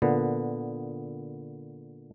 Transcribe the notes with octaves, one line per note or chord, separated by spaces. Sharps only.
A#2 D3 B3